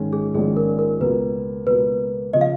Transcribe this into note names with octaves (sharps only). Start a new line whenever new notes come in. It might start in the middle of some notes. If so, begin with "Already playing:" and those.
Already playing: A#1 G#2 D#3 G#3 C#4
G#4
A#1 G#2 D#3 G#3 C#4 G#4
A#4
A#4
C#2 B2 A#3 B4
C#2 B2 A#3 B4
C#3 F3 D#5
F5